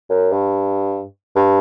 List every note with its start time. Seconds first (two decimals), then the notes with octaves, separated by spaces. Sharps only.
0.10 F#2
0.32 G2
1.36 G2